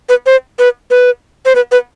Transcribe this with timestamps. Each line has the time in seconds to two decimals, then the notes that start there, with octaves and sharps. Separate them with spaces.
0.09 B4
0.26 C5
0.59 B4
0.91 B4
1.45 C5
1.55 B4
1.72 B4